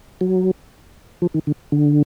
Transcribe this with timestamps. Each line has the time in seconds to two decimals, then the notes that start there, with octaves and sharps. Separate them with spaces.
0.21 F#3
1.22 F3
1.34 D#3
1.47 D3
1.72 D3